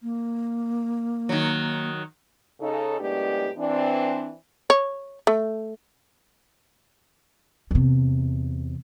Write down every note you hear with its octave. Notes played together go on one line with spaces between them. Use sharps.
A#3
D#3 F#3
C#3 D#4 A4
F#2 A2 G#3 B3 D4 G4
E3 C4 D4
C#5
A3
E2 C3